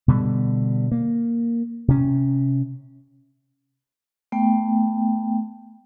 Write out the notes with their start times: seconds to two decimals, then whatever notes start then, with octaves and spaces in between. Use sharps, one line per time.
0.08 B2 D3 G3
0.92 A#3
1.88 C3 C#4
4.32 A3 B3 G5